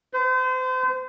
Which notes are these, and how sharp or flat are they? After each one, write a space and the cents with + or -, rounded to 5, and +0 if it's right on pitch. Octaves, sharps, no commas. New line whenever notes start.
C5 -35